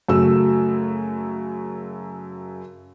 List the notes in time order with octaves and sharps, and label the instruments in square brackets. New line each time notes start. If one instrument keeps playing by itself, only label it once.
[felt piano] F#2 C#3 A3 F#4 E6